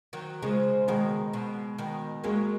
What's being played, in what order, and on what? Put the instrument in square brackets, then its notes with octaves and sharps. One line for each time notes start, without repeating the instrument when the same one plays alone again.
[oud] D#3 F#3
[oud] C#3 F3 [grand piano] G#3
[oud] B2 D#3 [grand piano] G#3
[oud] B2
B2 D#3
[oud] F#3 A#3 [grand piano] G#3